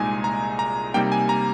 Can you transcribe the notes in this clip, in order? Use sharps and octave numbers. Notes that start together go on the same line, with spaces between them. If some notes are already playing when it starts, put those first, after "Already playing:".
Already playing: C2 A#2 G#3 D#4 G#5
A#5
A#5
C3 G3 A#3 D#4 G5
G#5
A#5